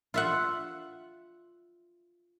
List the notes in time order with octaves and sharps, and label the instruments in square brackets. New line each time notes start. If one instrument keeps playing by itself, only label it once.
[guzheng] F4 E5 F#5